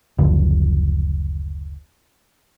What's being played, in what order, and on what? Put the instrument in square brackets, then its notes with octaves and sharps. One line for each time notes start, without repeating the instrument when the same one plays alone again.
[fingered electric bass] F#1 D2 D3 F3